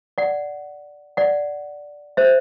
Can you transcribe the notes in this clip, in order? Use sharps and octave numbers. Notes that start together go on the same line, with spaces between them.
D5 F#5
D5 F#5
C5 E5